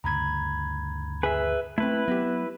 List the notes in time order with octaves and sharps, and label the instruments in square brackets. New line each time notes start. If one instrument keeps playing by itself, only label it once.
[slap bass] D2 G2 C#3 [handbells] A#5 B5 G#6
[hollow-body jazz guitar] G#4 G#5 [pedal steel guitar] B4 E5
[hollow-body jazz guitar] A3 C4 [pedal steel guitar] E4 B4
[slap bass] F#3 [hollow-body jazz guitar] B3 G4